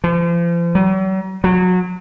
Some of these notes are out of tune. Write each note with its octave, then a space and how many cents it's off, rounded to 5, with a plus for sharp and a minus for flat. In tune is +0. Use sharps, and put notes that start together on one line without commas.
F3 -40
F#3 +45
F#3 -25